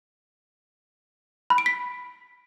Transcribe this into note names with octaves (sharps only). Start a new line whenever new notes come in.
B5
D7
B6